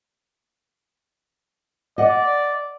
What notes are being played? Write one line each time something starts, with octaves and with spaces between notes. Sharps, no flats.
D5 D#5 F#5